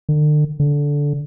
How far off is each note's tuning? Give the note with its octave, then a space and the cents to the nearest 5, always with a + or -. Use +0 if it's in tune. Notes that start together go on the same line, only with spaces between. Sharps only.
D3 +40
D3 -15